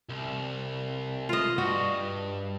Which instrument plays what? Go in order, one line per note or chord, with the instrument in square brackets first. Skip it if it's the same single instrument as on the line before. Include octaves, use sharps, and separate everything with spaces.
[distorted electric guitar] C2
[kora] F4 D#5
[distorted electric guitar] G2 [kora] F#4